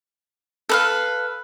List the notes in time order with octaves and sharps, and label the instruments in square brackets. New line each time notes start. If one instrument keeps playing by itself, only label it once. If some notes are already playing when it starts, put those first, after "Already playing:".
[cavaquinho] A4 B4 F5